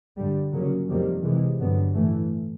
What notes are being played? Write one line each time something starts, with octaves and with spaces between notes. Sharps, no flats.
G2 D3 G3
C#3 F#3 A#3 C#4
F2 C3 D#3 G3 A#3
C3 E3 G#3
G2 D3 F#3 B3
A2 E3 A3